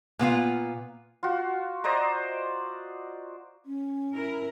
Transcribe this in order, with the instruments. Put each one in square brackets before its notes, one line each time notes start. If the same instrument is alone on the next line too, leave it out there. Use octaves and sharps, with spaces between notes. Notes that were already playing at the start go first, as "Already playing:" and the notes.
[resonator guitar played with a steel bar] A#2 B3 F4 F5
[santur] F4 F#4
C5 D5 D#5 A#5
[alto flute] C#4
[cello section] E4 A#4